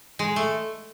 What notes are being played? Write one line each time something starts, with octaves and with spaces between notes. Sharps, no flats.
G#3
A3